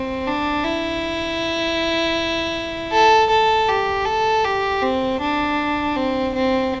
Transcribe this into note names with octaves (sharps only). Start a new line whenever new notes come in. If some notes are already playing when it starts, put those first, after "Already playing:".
Already playing: C4
D4
E4
A4
A4
G4
A4
G4
C4
D4
C4
C4